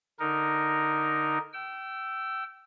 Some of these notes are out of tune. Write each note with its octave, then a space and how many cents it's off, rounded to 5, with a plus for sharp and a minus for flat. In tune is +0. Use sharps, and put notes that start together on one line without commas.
D3 +0 D#4 +0 A#4 +0
G5 -25 E6 +15